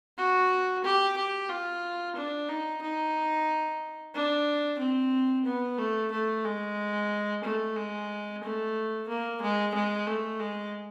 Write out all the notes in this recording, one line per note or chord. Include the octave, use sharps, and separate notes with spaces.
F#4
G4
G4
F4
D4
D#4
D#4
D4
C4
B3
A3
A3
G#3
A3
G#3
A3
A#3
G#3
G#3
A3
G#3